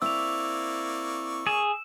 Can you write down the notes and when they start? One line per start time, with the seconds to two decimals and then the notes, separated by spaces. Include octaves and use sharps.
0.02 A#3 C4 E4 D5 C#6 E6 F7
1.47 G#4 E7